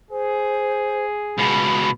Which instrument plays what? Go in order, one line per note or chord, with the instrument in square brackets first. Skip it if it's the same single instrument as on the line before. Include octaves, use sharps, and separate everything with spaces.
[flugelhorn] G#4 [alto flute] C5
[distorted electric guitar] C#2 B2 [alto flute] B5